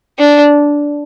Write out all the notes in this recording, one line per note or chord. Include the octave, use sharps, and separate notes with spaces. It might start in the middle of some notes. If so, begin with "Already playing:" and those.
D4